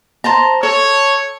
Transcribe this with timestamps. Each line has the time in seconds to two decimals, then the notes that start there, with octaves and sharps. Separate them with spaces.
0.24 C5 A5 A#5
0.63 A4 C#5